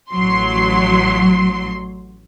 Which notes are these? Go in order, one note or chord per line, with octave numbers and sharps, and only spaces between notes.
A1 F#3 C6